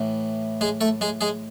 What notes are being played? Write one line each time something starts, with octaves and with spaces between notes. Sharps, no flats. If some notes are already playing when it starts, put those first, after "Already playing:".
Already playing: A2 E3
G#3 G#4
A3 A4
G#3 G#4
G#3 G#4